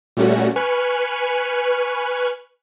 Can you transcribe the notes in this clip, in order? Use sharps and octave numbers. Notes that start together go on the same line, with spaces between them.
A#2 G3 A3 C#4 F#4
B4 G#5 C#6 F6 F#6